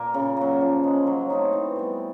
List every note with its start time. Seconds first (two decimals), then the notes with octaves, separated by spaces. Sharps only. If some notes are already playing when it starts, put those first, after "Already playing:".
Already playing: A#2 A#3
0.14 C#3
0.37 F#3 A#3
0.61 F3
0.84 G#3 C#4
1.07 F#3
1.30 A3 C4 D#4
1.53 E3
1.76 G3 B3